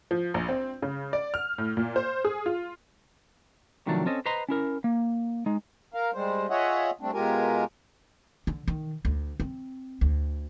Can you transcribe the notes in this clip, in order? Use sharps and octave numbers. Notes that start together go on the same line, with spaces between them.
F3
A#1
C4
C#3
D5
F6
A2
A#2
C5
G#4
F4
C3 D#3 F3 F#3 A3 D4
C4 C#4 A4 D#5
B4 C5 D#5 A#5 C6
C#4 E4 A#4
A#3
G#3 D#4
A#4 F5
G3 G#3 C5
F4 G#4 C#5 D#5 E5 F#5
G3 A3 C4 D4
B2 G#3 F4 G4 A#4 G#5
D3
D#3
D2
C4
D2